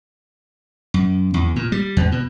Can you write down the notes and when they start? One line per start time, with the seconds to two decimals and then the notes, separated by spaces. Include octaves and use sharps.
0.94 F#2
1.34 E2
1.56 A#2
1.72 G3
1.97 E2
2.12 B2